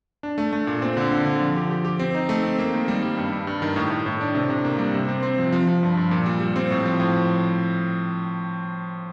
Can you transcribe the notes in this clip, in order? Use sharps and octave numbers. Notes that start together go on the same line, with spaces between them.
D4
A3
A3
A#2
C4
D3
D3
D3
F3
G4
G4
G4
C4
D#4
A3
C4
A#3
D#3
G3
G3
G2
G2
G2
D#3
A2
A2
A2
D4
C3
C3
A#3
G3
C3
C4
C4
F3
F3
F3
G2
G2
A#2
G3
G3
C4
A2
F3
A2